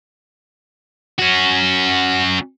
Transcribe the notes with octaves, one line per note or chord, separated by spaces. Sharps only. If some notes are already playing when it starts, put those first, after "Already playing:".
C#4 F#4